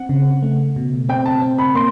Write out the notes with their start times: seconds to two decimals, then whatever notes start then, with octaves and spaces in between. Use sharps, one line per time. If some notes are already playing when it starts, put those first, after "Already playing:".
Already playing: C4 F#5
0.09 C#3
0.43 A3
0.76 B2
1.09 C4 G5
1.26 A5
1.42 C4
1.58 B5
1.75 A#3 C6